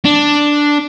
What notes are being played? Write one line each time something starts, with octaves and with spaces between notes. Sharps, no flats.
D4